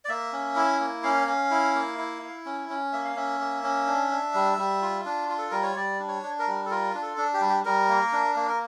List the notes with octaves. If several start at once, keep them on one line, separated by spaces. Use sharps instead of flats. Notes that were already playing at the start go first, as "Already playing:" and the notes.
D5
A#3 E5
C#4
E4
A#3
C#4 F5
C#4
E4
A#3
E4
E4
C#4
C#4
A#3 E5
F5
C#4 E5
A#3
C#4
D4
D4
G3
G3
F4
D4
F4
A4
G3 A#4
C#5
G3 D5
D4
C#5
D4
A#4
G3
A4
F4 A#4
D4
A4
D4
G4
G3
G4
G3 A#4
A#3
D4
A#3
A#4